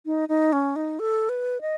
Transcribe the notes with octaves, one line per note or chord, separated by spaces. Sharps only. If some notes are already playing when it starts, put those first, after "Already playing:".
D#4
D#4
C#4
D#4
A4
B4
D#5